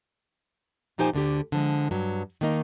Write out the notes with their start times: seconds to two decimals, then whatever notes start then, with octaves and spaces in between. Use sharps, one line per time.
0.98 A#2 F3 D#4 G4 C5 G#5
1.13 D2 D3 G4
1.52 D3 F3 G#3
1.91 G2 F#3
2.41 D#3 A3 A#3 D#4